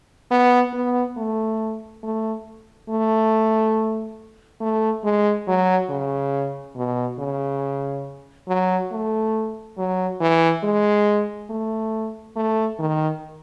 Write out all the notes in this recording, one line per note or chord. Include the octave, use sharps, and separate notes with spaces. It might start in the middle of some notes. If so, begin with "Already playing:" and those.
B3
B3
A3
A3
A3
A3
G#3
F#3
C#3
B2
C#3
F#3
A3
F#3
E3
G#3
A3
A3
D#3